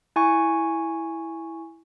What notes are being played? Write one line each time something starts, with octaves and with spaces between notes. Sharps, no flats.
E4 G#5 C#6